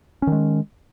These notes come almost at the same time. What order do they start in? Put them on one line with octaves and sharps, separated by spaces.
C#4 D#3 G#3